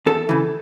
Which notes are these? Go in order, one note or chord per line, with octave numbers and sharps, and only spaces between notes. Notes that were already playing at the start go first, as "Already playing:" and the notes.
E2 A4
C#3 E3